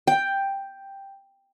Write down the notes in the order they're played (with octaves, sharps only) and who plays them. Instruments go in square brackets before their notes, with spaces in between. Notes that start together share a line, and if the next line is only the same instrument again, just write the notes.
[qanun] G5